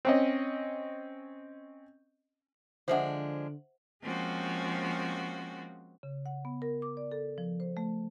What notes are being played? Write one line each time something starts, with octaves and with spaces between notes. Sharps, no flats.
C4 C#4 D#5
D3 F3 G#3 D4 C5 E5 F#5
F3 G#3 A#3 C4 C#4 F#4
C#3
F#5
B3
A#4
D6
D5
A4
F3
C5
A3